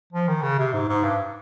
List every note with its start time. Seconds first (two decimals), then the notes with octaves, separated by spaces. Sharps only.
0.12 F3
0.28 D#3
0.42 C#3
0.59 C3
0.73 G#2
0.89 G#2
1.03 G2